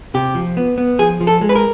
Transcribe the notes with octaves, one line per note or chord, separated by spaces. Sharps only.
C3 G4
F3
B3
B3
F3 G#4
F3
A4
G#3
B4
A#4